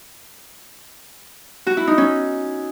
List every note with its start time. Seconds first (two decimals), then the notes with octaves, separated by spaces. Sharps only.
1.67 F#4
1.77 E4
1.87 D#4
1.98 C#4